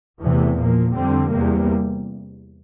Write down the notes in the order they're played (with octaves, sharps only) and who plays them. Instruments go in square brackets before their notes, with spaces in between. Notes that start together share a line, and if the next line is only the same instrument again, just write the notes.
[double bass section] E2 C3 E3 A3
A#2 F3 A#3
F2 D3 G3 C4
E2 C3 G3 A#3